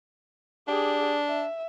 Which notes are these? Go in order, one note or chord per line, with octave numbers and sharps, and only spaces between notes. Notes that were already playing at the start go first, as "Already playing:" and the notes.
D4 G4 G#4
E5